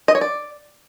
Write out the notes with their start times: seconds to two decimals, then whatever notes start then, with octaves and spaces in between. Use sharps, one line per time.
0.08 D#5
0.15 C#5
0.21 D5